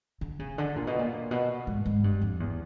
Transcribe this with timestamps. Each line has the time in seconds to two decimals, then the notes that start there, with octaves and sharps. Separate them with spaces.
0.21 D3
0.39 C#3
0.58 D3
0.76 A#2
0.87 B2
0.99 A#2
1.31 B2
1.67 G#2
1.85 G#2
2.04 G2
2.21 F2
2.40 E2